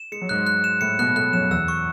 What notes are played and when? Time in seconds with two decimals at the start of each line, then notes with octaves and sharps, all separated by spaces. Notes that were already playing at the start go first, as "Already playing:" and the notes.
Already playing: E7
0.12 G#3 C#7
0.21 F#3
0.29 G#2 G#3 F#6
0.46 F#6
0.64 E7
0.81 A2 A3 C#7
0.99 B2 B3 F#6
1.16 A2 A3 F#6
1.33 F#2 F#3 E7
1.51 E2 E3 E6
1.68 C#6